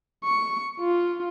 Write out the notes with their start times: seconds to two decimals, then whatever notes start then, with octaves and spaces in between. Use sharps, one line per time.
0.25 C#6
0.80 F4